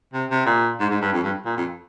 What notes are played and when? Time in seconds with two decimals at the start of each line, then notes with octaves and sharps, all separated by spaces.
0.14 C3
0.30 C3
0.46 A#2
0.80 G#2
0.90 G#2
1.02 G2
1.13 F2
1.23 G2
1.45 A#2
1.57 F2